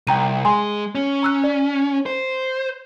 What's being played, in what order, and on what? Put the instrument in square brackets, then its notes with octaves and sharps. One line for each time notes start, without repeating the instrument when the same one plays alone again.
[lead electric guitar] C2 [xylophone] G5 A#5 D#7
[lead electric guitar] G#3 [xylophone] G#5 C6
[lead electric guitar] C#4
[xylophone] A#5 E6 F#6
D5
[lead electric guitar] C5